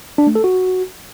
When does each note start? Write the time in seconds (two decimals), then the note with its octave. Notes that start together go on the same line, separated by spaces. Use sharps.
0.18 D4
0.27 A3
0.35 A4
0.44 F#4